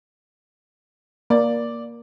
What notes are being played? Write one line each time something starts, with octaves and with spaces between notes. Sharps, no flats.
A#3 D5